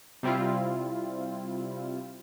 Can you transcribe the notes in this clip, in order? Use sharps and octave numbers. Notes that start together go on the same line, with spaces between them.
C3 G3 C4 E4 F4